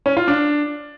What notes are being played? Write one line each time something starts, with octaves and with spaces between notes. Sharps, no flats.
C#4
F4
D4